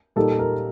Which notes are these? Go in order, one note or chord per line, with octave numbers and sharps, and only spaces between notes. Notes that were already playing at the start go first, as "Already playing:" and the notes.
A#2 G3 A#3 D#4 A4
A#4